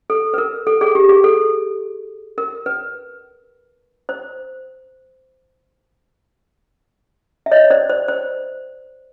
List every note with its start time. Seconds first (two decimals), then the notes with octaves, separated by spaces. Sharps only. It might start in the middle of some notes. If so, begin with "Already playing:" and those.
0.10 A4
0.34 B4
0.38 A#4
0.67 A4
0.81 G#4
0.95 G4
1.09 G#4
1.24 A4
2.38 A#4
2.66 B4
4.09 C5
7.46 E5
7.52 C#5 D#5
7.70 C5 D5
7.89 C5
8.08 C5